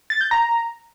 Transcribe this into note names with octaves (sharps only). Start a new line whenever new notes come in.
A6
G6
A#5